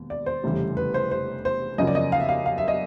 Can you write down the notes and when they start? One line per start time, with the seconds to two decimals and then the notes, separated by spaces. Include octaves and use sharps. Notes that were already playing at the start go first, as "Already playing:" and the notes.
Already playing: E1 D#2
0.10 D5
0.26 C5
0.44 F1 E2 C#3 E3 G3
0.77 B4
0.94 C5
1.11 C5
1.45 C5
1.78 F#2 C#3 F3 A#3 D#5
1.87 D5
1.95 D#5
2.12 F5
2.20 E5
2.29 F5
2.46 F5
2.58 E5
2.68 D#5